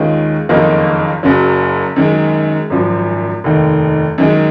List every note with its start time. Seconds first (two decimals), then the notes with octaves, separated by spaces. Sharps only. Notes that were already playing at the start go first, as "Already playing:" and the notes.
Already playing: D#2 D#3 G#3 C#4 F4
0.49 F#1 F2 D#3 A#3 D#4
1.23 F#1 F#2 C#3 F#3
1.96 F#2 D#3 G#3
2.70 G#1 F#2 F3
3.44 F1 D#2 D#3
4.18 F#2 D#3 G#3